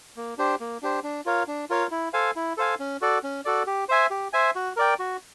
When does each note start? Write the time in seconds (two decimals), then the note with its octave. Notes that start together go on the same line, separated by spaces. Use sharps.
0.17 A#3
0.38 D4 G4 C5
0.60 A#3
0.82 D4 G4 C5
1.03 D4
1.26 F4 A#4 C#5 F5
1.48 D4
1.70 F4 A#4 C#5 F5
1.91 E4
2.13 A4 C5 F5 G#5
2.36 E4
2.57 A4 C5 F5 G#5
2.80 C#4
3.01 F#4 A4 D5
3.23 C#4
3.45 F#4 A4 D5
3.67 G4
3.89 C5 E5 G#5
4.11 G4
4.33 C5 E5 G#5
4.55 F#4
4.76 A#4 D5 G5
4.99 F#4